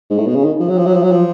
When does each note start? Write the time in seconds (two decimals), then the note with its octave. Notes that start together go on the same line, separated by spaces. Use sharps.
0.10 G#2
0.18 A2
0.26 B2
0.35 C#3
0.44 D#3
0.60 F3
0.69 F#3
0.77 F3
0.86 F#3
0.94 F3
1.03 F#3
1.11 F3